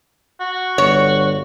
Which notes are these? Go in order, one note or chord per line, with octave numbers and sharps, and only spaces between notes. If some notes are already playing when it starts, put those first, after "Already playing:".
F#4
G1 C#5